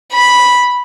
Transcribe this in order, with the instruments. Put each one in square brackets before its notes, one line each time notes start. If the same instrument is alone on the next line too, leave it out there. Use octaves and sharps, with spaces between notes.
[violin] B5